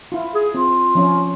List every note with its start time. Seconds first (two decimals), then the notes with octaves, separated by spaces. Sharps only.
0.12 E4 F4
0.35 G#4
0.54 C4 F4
0.95 F3 C#4